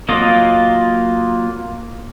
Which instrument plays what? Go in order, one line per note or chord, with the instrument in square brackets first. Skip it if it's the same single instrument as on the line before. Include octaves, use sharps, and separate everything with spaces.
[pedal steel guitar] F#3 A#3 F4 D#5